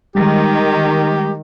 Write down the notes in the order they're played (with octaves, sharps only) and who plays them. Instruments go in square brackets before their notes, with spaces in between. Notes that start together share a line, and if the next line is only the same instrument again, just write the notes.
[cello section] D#3 [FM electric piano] G3 G#3 [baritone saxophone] G4